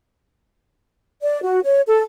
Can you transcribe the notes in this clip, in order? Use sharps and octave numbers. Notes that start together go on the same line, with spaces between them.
D5
F#4
C#5
A4